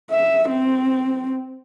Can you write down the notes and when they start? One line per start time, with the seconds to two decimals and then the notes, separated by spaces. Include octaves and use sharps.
0.10 E5
0.50 C4